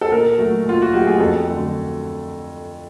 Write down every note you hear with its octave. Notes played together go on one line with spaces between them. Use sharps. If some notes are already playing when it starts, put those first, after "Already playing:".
A4
A#2 A#4
F#3 A3
A#2 F4
F#4
F#3 A3 G4
G#4
F2 A4
D3 F#3 A3